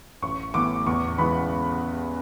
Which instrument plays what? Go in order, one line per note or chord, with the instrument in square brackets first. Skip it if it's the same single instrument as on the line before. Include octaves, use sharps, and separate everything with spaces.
[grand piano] A1 C#6
A2 E3 B3 D6
E2 C#6
C#3 E3 G#3 B3 B5